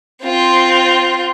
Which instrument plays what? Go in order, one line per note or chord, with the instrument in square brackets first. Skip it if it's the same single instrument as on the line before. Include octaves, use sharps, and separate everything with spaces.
[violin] C4 F4